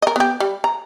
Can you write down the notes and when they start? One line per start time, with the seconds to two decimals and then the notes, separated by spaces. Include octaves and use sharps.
0.02 A#4 D#5
0.16 B3 G4
0.40 G3
0.64 A#5